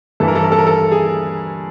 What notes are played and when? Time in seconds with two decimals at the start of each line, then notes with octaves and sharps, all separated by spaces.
0.20 G2 E3 A4
0.28 A#4
0.35 A4
0.43 A#4
0.52 A4
0.59 A#4
0.67 A4
0.92 G#4